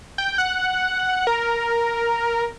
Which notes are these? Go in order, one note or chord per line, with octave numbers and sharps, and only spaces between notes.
G5
F#5
A#4